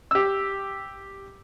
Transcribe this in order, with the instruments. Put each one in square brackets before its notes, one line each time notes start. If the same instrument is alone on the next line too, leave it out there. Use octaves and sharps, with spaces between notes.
[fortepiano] G4 E6